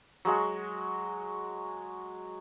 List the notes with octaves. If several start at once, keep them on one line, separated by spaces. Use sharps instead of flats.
F#3 G#3 F#4